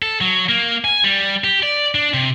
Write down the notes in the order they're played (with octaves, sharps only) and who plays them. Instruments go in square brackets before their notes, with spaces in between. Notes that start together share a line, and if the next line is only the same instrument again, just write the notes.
[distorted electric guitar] A4
F#3
A#3
G#5
G3
G4
D5
D4
C3